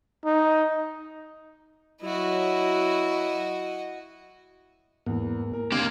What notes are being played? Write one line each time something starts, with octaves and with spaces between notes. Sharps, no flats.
D#4
F#3 E4 F#4 D#5
E2 G#2 E3 A#3
A#4
C3 A#3 D4 G4 G#5 C6 G#6